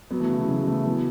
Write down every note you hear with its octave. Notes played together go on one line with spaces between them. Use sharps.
F#3 B3
E3 A3
C#3 F#3
C#3 F#3
E3 A3
F#3 B3